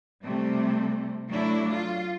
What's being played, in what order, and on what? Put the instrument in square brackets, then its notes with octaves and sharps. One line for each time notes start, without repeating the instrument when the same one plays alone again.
[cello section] C3 G3 A3
F#3 A3 D4 E4
F4